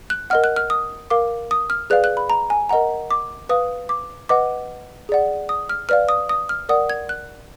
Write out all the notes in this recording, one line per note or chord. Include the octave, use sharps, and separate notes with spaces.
F#6
A#4 D#5 F#5 F6
F#6
F6
D#6
A#4 F5 D6
D#6
F6
G#4 B4 D5 F5 F#6
F#6
B5
A#5
G#5
A#4 D#5 F#5 A#5
D6
B4 F5 D#6
D6
B4 D#5 F#5 D6
G#4 D5 F#5
D#6
F6
B4 D5 F5 F6
D#6
D#6
F6
A#4 D5 F#5 D#6
G#6
F#6